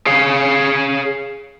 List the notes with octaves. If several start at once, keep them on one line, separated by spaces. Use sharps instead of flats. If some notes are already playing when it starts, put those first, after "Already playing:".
G#4 C#5 F5